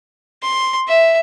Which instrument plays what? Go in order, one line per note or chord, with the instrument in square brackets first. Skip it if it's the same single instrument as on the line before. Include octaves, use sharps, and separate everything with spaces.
[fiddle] C6
E5